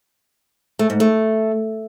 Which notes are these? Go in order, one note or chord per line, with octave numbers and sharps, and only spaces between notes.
A3
G#2
A3